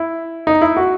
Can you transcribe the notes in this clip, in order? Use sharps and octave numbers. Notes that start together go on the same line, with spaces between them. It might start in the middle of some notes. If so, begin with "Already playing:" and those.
Already playing: E4
D#4
E4
F#4